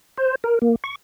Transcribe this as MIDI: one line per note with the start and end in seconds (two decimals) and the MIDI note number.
0.17 0.35 72
0.44 0.59 70
0.62 0.75 58
0.84 0.95 85